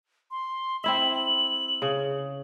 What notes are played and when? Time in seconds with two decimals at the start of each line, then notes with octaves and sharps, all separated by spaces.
0.31 C6
0.84 C4 E4 E5 F#7
1.82 C#3